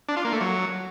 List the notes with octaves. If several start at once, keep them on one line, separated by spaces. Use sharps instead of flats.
D4
F4
A#3
A3
F#3